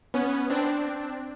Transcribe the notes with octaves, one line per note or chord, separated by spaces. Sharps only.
B3 C#4
C4 D4